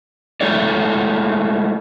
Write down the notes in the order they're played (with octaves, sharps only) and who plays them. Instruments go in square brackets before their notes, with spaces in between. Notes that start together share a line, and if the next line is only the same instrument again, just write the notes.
[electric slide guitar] G#3 A3 E4 A4 C#5 D5